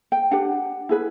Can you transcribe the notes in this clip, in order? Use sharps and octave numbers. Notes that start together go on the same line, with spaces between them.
G5
D4 G4 B4 F#5
E4 G#4 B4